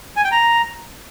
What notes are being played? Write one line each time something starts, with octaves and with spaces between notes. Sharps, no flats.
G#5
G5
A#5